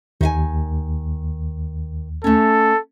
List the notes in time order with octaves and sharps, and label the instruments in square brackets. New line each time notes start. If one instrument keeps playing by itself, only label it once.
[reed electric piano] D#2 [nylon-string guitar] D#3 E5 G#5
[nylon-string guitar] A3 C#4 [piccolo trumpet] A4